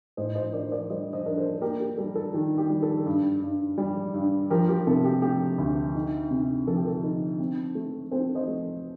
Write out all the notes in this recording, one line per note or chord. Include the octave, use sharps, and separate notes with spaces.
A2 C5 D#5
C5 D#5
D4 A#4 D5
C5
A#4 D5
G3 C5 D#5
C5 D#5
D4 A#4
A4 C5
A4
A#3 G4 A#4
G4
G3 A4
A4
D#3 G4
G4
G3
A4
G2
G2
G3
G2
F3 G4 A#4
G4 A#4
C3 A4
G4
A3 G4
D2
D#4
C3
F3 A4
G4
A4
D#4
C4
A3
C4 A4 C5
C5 D#5
A3